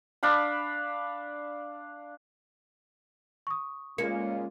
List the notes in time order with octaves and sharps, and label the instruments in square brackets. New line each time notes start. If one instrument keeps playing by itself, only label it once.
[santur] D4 F5 B5
[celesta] C#6 D#6
[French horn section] A#2 C#3 F4 [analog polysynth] G#3 C#4 [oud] A#3 [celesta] C#7